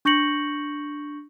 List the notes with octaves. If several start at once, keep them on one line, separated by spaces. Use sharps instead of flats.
D4 C#6 G6 A#6 C#7 F#7